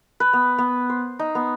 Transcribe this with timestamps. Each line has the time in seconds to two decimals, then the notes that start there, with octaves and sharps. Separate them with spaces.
0.20 B4
0.33 B3
0.58 B3
0.90 C5
1.19 D#4
1.35 B3